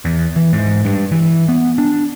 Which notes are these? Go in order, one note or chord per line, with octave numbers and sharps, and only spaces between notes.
E2
E3
G#2
G2
E3
B3
D4